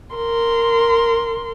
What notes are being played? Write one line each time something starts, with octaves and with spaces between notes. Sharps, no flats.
A#4 C6